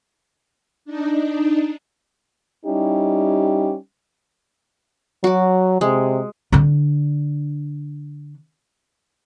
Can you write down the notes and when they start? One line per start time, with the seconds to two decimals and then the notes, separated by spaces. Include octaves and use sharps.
0.85 D4 D#4
2.65 G3 C#4 D#4 E4 G4
5.24 F#3 F#4 D6
5.81 C3 G#3
6.52 D3 D4